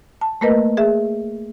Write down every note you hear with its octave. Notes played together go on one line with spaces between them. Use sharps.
A5
A3 A#3 A#4 B4 D#5
G#4 E5